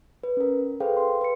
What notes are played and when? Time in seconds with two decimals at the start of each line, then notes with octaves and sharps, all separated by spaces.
0.23 B4
0.37 C#4 A#4
0.80 G#4 A4 B4 C5 F5 G5
0.97 C6
1.21 B4 C#7